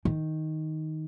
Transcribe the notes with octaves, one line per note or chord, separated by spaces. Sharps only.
D#3